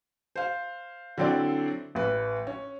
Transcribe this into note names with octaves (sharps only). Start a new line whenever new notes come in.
C5 F5
D3 F#3 C4 E4 D5
A1 B4
C#4